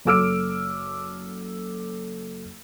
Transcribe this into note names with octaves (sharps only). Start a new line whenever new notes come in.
F#1 A4 D6 E6 F6 D7